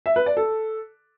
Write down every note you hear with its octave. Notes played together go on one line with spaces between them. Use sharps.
E5
B4
D5
A4